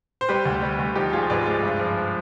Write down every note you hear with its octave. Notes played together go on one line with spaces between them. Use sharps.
C5
G3 G4 B4
D2
G3
D2
F3 D#4 G4
G#3 F4 G#4
G#2 B4 D5
G#3
G2
F3